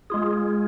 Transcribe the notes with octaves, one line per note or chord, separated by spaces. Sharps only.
G#3 F4 G#4